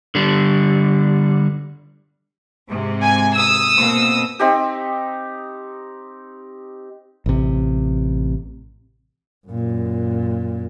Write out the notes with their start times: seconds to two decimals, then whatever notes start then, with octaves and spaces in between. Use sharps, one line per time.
0.15 D3 G3
2.69 G#2 C3
3.01 G#5
3.35 D#6 E6
3.76 B2 A#3 C4
4.39 C4 D#4 G4
7.26 A1 C3
9.47 F#2 A#2